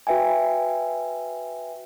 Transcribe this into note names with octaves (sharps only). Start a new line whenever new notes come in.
F#4 B4 E5 G5 G#5